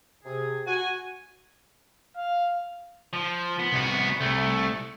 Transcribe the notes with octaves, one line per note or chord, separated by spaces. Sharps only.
C3 G#4
F#4 F#5 G#5
F5
F3
B3
C2 F#4
C2 A3